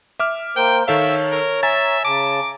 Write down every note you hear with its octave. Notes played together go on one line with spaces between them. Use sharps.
E5 D6 F6
A#3 A#4 C5 G5
D#3 A4 C#5 E5 F5
A#4
E5 G#5 A#5 A6
C#3 A5 D6